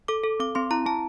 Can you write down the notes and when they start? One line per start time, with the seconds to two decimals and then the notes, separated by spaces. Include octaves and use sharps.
0.08 A4 D6
0.24 A4
0.40 C4 D6
0.55 C4 C6
0.71 E4 A#5
0.86 C4 A5